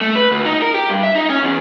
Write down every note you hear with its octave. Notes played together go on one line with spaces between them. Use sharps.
A3
B4
D2
D#4
A#4
G4
G2
E5
D#4
C#4
E2